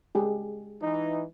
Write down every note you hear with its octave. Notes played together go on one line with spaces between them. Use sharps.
G#3 G4 G#4
E3 D#4